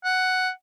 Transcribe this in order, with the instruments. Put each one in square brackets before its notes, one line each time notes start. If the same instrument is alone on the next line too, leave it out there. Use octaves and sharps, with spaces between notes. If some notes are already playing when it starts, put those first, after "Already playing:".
[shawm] F#5